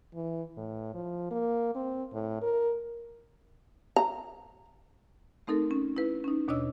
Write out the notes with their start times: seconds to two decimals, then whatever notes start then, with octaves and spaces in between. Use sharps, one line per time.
0.14 E3
0.57 A2
0.94 F3
1.31 A#3
1.75 C4
2.13 A2
2.42 A#4
3.96 A#5
5.47 A3 C4 D#4 A4 A#4
5.71 C#4
5.97 E4 B4
6.24 C#4 D#4
6.48 D#2 B2 D4 C#5 D#5 E6